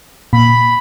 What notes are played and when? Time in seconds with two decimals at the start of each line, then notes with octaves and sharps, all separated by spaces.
0.33 A#2 B5